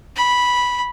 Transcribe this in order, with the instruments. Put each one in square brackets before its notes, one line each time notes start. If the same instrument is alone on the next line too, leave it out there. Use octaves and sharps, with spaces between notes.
[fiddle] B5